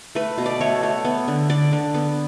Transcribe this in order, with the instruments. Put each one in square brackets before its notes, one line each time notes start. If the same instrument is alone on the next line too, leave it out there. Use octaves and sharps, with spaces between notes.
[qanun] A3 B4
B2
D5
A3 C#5
A3
B3
D3
D3 D5
D3
B3